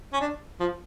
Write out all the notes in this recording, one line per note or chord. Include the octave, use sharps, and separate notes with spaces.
C#4
D4
F3